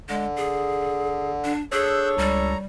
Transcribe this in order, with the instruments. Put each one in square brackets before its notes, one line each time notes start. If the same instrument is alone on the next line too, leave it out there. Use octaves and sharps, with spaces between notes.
[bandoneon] D3 [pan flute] G#3
[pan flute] G#4
D4
[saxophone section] D4 A4 C#5 [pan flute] G#4 [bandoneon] E6 F#6 G6
[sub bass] C#2 [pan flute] G3 [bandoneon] A#5